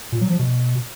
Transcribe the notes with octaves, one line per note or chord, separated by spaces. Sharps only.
A#2
F#3
F3
B2